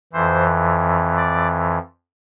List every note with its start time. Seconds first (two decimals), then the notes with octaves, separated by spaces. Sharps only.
0.13 F2 E3 C5
1.17 D5